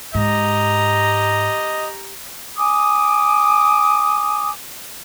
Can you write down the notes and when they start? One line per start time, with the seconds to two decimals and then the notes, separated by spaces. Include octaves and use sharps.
0.15 G#2 G4 D#5 A#5
2.57 G#5 D6 D#6